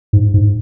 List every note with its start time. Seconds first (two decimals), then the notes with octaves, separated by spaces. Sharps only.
0.13 G#2
0.34 G#2